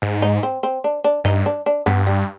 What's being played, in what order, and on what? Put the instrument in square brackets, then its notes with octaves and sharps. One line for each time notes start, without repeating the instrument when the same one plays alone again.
[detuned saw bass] G#2
[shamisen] D#4
C4
C4
D4
D4
[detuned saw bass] G2 [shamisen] D#4
[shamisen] D4
D4
[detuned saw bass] G2 [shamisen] B3
[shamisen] G3